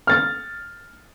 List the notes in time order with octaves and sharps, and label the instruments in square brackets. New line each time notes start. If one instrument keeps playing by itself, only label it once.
[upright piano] F6 A6